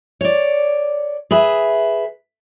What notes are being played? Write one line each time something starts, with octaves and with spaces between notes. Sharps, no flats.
C#5 D5
G#4 B4 E5